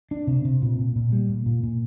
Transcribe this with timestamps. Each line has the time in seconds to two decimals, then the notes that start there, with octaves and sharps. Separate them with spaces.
0.11 D4
0.27 C3
0.45 C3
0.62 A#2
0.78 A#2
0.96 A#2
1.12 G3
1.29 A#2
1.46 A#2
1.63 A#2